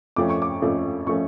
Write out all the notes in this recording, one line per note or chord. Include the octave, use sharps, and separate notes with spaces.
F2 F3 A3 C#4 D6
C#6
D6
F2 F3 A3 C#4
F3 A3 C#4 C#6